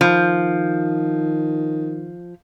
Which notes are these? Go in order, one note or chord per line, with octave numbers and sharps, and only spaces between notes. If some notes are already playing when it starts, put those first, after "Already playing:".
D#3 F3